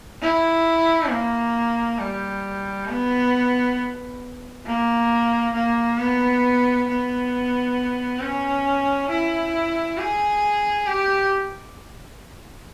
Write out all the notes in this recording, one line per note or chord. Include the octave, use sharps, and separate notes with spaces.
E4
A#3
G3
B3
A#3
A#3
B3
B3
C#4
E4
G#4
G4